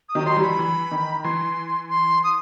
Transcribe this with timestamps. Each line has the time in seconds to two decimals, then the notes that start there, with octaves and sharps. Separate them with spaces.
0.09 D#6
0.15 D#3 F#3
0.26 F#3 C6
0.37 E3 G3
0.42 B5
0.59 E3
0.91 D#3
1.24 E3 C6
1.90 C6
2.24 D#6